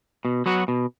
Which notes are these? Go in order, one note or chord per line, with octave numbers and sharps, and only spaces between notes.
B2
F#3 B3 F#4
B2